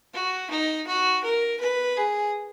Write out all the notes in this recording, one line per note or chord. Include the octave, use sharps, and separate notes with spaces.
F#4
D#4
F#4
A#4
B4
G#4